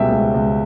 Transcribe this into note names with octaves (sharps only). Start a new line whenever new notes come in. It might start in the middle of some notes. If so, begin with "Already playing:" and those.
Already playing: C#2 B2 G3 E5 G5
C#2
C#2